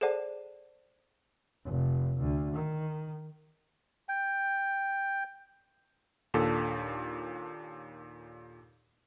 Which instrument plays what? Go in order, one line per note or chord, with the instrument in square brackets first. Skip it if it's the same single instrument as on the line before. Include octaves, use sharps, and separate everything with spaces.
[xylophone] G#4 A4 C5 D5 F#5 A5
[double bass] F1
D2
D#3
[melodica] G5
[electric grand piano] D#2 A#2 D4 A4